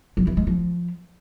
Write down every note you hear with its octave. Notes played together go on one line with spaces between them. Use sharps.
F#3
E3
G#3
F3